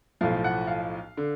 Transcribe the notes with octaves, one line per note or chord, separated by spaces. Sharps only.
B1 A2 F3 F5
F#5
F5
D3